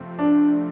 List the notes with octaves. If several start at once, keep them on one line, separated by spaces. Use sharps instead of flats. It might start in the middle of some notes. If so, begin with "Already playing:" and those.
Already playing: F2 C3 F3 A3 C4
D4